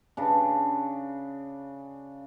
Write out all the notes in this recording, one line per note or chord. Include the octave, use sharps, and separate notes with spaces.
C#3 D4